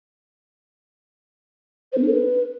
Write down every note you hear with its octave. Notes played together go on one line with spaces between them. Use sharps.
C5
B3
D4
A4
B4